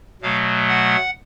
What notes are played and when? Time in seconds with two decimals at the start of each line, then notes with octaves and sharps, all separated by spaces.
0.22 B2 F#3 A3 F5
0.68 F#5